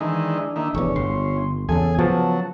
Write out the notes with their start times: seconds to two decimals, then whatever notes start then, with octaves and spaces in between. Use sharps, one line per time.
0.01 D#3 E3 G#3 D4
0.56 D#3 A#3 E4
0.75 F1 E2 C#4
0.96 G1 C6
1.69 E2 C#3 G#4 A4 G#5
1.98 C#3 F3 F#3 B3 A5